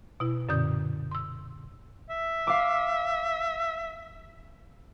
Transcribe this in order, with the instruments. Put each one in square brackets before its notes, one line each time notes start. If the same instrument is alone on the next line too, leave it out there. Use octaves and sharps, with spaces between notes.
[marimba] B2 E4
F#2 A#2 D3 C#4 D#6 G6
C6 E6
[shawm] E5
[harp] F5 D6